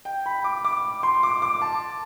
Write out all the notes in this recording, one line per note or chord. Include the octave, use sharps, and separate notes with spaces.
G5
B5
D6
D6
C6
D6
D6
A5